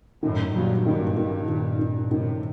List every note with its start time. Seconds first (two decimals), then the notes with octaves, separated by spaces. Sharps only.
0.23 F#2 A2 D#3
0.54 G2 A#2 F#3
0.85 G2 A#2 D#3
1.17 D#3
1.49 D#3
1.79 D#3
2.10 A2 C3 D#3